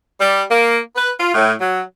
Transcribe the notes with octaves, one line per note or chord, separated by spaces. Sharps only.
G3
A#3
B4
F4
A2
F#3